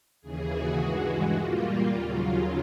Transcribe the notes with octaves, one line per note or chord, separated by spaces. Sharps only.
D#2 C#3 E3 G#4
F#4
G2 E3 G#3
F#4
A#2 G3 A#3 F4
F4
D#2 C#3 F#3
F4